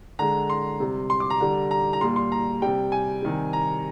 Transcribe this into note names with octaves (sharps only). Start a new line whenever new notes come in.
D3 G#3 A#5
C6
C3 G3
C6
D6
A#5
D3 G3
A#5
A#5
A#2 G3 C6
C6
A#5
C3 G3 G5
G#5
C3 D#3 G3
A#5